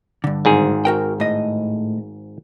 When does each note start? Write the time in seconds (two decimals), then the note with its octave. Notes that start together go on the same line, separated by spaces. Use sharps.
0.24 G2 D3
0.45 G#1 G#2 G#4
0.85 F#4 A#4 G5
1.20 A2 D#5